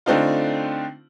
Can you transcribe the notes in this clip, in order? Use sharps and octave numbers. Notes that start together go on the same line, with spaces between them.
D3 A3 C4 D4 D#4 F4